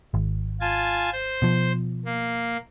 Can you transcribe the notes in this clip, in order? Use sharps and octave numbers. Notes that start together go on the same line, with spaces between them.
G#1
F4 G#5 A5
C5
B2 F3
A#3